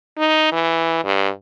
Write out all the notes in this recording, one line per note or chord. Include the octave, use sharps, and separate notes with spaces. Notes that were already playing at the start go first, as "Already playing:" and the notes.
D#4
E3
G2